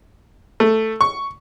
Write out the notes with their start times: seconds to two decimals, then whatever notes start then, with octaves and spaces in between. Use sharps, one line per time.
0.60 A3
1.01 C#6